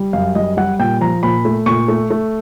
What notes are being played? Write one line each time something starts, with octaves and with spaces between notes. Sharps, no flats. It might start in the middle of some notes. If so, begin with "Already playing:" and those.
Already playing: G3
F#2 F5
G3 D#5
G3 F#5
A#2 G5
F3 A#5
A#2 B5
A3
A#2 C#6
A3
A3